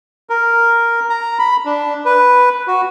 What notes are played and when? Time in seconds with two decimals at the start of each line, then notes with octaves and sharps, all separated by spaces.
0.30 A#4
1.10 A#5
1.39 B5
1.65 D4
2.05 B4
2.68 F#4